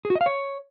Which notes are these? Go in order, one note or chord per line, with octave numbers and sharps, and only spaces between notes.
G#4
F#4
D#5
F5
C#5